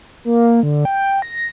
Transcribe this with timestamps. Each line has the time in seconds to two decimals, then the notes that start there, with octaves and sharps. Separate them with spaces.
0.25 A#3
0.63 D3
0.85 G5
1.22 A#6